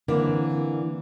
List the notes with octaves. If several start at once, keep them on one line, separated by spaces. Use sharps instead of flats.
D3 E3 A#3 C4 D4